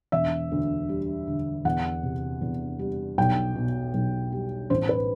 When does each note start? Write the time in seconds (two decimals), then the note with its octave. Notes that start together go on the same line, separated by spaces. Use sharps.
0.12 E1 E5
0.51 D2
0.89 G3
1.27 D3
1.65 E2 F#5
2.03 C3
2.42 E2
2.79 G3
3.18 B1 G5
3.55 B2
3.94 B1
4.32 G3
4.70 A1 C5
4.89 B4